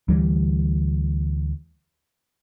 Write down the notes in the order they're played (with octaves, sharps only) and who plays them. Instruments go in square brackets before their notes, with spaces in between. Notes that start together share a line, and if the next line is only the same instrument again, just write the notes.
[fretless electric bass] D2 E3 G3